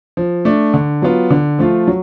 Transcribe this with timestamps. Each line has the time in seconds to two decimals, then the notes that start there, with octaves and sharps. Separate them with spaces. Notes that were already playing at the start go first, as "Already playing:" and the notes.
0.17 F3
0.45 A3 D4
0.74 D3
1.02 F#3 B3 F4
1.30 D3
1.59 F3 A3 F4
1.87 F#3